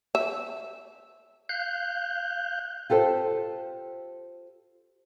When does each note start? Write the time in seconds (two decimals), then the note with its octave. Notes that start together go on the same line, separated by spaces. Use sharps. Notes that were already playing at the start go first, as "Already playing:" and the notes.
0.15 E5
1.49 F5 F#6 G6
2.90 F4 G4 A4 C5